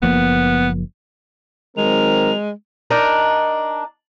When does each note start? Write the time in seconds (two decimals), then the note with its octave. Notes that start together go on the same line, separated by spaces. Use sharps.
0.03 F#1 F3 A#3 B3
1.77 D#3 F#3 G#3 C4 A#4 F7
2.91 D4 D#4 A#4